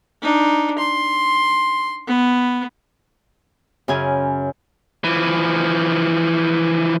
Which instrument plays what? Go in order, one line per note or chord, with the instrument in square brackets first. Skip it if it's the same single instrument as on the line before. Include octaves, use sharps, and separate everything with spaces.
[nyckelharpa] D4 D#4
C6
B3
[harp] F#2 C#3 G#5
[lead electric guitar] E3 F3